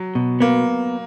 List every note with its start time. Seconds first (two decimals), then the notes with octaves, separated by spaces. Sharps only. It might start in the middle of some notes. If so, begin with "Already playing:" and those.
Already playing: F#3
0.15 B2
0.40 A#3 B3